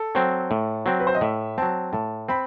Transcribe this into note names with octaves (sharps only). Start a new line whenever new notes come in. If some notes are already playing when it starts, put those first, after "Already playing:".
Already playing: A4
F#3 C4
A2
F#3 C4
B4
C5
D#5
A2 E5
F#3 C4 A5
A2 A5
C4 B5